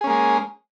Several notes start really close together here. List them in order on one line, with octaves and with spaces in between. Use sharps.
G#4 C#4 A#3 G#3